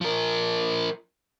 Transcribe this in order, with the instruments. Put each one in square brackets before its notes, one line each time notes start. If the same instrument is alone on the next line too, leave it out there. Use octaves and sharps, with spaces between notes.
[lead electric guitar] F3 A#4